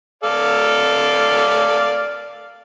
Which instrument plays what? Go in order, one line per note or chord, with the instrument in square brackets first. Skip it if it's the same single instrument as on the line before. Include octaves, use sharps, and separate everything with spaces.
[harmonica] A4 D5 F5